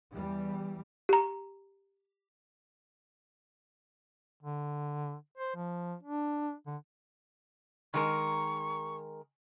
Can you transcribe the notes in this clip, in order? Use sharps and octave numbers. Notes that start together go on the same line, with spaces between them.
E2 E3 G3
G4 A#5
D3
C5
F3
D4
D3
D#3 G#3 A#4 C#6